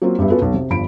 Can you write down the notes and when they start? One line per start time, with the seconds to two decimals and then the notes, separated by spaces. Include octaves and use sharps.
0.02 F#3 A#3 C4 F4
0.18 G2 G3 B3 E5
0.30 B3 C#4 F4 F#4 A4 B4
0.42 B1
0.54 C3
0.70 G1 G2 F3 B5 D7